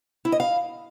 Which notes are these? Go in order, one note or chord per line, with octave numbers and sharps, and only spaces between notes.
E4
D#5
F5